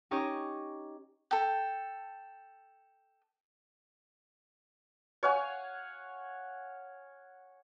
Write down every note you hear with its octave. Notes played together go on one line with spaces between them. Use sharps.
C#4 D#4 G4 C#5 D#5 C#6
A4 G5
C#5 F5 F#5 G#5